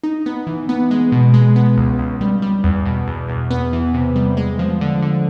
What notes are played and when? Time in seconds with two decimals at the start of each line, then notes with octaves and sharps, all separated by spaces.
0.04 D#4
0.26 B3
0.47 E3
0.69 B3
0.91 G#3
1.12 B2
1.34 G#3
1.56 B3
1.77 C#2
1.99 C#2
2.21 G3
2.42 G3
2.64 E2
2.86 B2
3.07 E2
3.29 E2
3.51 B3
3.73 E3
3.94 C3
4.15 G3
4.37 G#3
4.59 F3
4.81 D3
5.02 D3